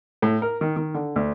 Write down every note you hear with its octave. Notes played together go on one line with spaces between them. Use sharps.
A2
A#4
D#3
D#3
D3
D2